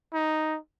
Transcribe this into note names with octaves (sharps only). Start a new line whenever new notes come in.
D#4